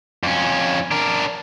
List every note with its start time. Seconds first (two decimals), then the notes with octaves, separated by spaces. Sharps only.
0.23 F2 C#4
0.91 D4 A#4